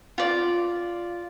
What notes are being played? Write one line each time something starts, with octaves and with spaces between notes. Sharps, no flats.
F4 D5